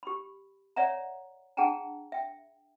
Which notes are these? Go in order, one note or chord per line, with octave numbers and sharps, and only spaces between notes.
G4 B5
C#5 D5 E5 F#5 A#5
D4 G#4 F#5 G5 A5 A#5
E5 G5